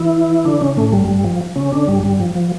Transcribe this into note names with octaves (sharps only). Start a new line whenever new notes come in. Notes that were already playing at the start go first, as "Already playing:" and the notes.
Already playing: E3 E4
D3 D4
C#3 C#4
A2 A3
G2 G3
G2 G3
F3
C#3 C#4
D3 D4
G2 G3
G2 G3
F3
F3